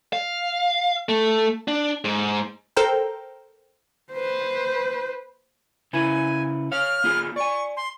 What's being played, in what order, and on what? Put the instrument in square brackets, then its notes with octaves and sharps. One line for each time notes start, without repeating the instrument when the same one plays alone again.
[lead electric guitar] F5
A3
D4
G#2
[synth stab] A4 A#4 C5 G5 A#5
[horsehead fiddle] B4 C5
[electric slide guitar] C#3 E4 B4 [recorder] G#5
[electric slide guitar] C#5 F5 [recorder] F6
[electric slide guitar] B3 F4 G#4
[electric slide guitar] D5 G#5 [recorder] C#6
[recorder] C6